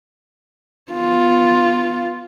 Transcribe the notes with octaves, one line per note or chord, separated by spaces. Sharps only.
B3 F4